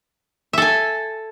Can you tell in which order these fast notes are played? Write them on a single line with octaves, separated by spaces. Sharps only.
E5 A4 G#5